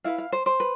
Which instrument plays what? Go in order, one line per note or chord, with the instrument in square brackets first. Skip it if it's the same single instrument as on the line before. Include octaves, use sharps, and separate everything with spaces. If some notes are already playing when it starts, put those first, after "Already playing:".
[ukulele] E4 B4 F5
F5
C5
C5
B4